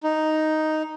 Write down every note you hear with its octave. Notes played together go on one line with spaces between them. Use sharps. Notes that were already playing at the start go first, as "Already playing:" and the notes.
D#4